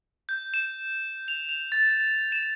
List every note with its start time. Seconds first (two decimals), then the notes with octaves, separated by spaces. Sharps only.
0.29 G6
0.54 E7
1.28 F7
1.49 F7
1.72 A6
1.89 A6
2.32 E7